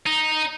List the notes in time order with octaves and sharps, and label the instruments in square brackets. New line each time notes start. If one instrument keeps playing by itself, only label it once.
[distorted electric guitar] D#4